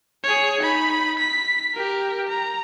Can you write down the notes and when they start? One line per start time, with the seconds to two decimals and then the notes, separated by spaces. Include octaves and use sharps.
0.24 G#4 C#5
0.61 D#4 B5
1.19 B6
1.73 G4 A#4
2.28 A#5